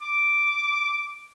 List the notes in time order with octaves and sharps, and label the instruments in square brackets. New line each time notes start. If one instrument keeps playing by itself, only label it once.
[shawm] D6